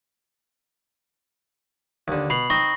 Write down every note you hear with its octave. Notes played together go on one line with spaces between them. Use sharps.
D#2 D3
B2 B5 C7 F#7
C4 D#4 C#6 A#6